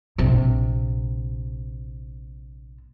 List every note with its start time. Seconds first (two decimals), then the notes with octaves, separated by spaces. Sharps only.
0.18 A#1 C3